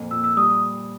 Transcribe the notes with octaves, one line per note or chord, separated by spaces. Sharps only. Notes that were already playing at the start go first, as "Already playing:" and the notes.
Already playing: F2 A#2
A#2 E6
E6
G3 D#6